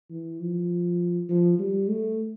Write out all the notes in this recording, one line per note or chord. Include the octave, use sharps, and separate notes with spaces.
E3
F3
F3
G3
A3